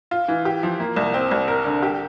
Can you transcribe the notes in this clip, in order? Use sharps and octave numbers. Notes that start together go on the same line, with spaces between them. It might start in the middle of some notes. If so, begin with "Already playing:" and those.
F4
E3
G4
F3
A#3
C2
C4
C2
A#4
D3
G4